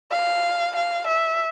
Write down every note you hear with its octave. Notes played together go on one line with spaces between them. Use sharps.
F5
F5
E5